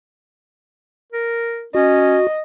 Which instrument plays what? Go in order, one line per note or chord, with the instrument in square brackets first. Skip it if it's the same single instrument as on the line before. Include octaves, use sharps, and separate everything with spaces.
[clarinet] A#4
[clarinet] C#4 [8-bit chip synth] F#4 [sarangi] D#5